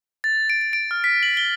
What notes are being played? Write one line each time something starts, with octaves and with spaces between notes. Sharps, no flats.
A6
D7
D7
D7
F6
B6
F#7
G7